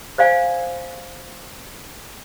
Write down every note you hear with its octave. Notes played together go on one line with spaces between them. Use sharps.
C5 D5 F5 G#5